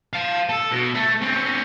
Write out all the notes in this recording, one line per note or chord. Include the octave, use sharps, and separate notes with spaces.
F5 A5
A4
B2
A3
C4 C#4